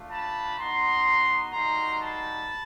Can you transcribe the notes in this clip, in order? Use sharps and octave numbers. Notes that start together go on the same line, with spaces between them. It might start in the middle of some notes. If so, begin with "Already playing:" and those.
Already playing: A3 D4 F4
A5 B5
B3 D#4 F#4 A#5 C6
G3 A#3 D#4 F#4 A#5 C6
A5 B5